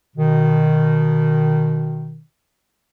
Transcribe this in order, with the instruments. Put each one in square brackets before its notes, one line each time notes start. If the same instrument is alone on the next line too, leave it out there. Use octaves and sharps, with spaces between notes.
[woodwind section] B2 D#3